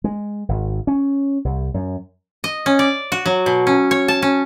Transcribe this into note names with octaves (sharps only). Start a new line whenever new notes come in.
G#3
G#1
C#4
C2
F#2
D#5
C#4
D5
F#4
F#3
B2
C#4
C#5
A5
C#4